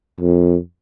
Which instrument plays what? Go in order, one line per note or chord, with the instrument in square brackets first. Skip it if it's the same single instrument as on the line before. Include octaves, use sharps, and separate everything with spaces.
[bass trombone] F2